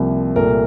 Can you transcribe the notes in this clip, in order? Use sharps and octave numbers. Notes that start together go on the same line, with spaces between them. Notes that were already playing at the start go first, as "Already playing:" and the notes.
Already playing: C2 C3 F3 A#3
C2 A#2 A3 A#4